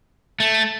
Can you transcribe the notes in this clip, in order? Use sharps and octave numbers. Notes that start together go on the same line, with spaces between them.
A3